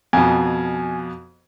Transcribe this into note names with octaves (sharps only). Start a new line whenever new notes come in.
F2 B2 G#5